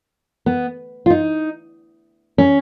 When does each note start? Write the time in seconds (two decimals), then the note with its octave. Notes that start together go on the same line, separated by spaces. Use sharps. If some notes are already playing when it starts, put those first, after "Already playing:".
0.46 B3
1.06 F4
1.10 D#4
2.38 C#4